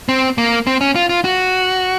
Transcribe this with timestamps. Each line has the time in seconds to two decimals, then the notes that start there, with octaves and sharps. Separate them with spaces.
0.09 C4
0.38 A#3
0.67 C4
0.81 C#4
0.96 F4
1.09 F4
1.24 F#4